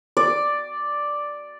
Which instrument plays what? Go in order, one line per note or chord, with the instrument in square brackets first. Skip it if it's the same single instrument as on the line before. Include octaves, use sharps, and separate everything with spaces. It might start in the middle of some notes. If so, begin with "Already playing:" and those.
[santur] D5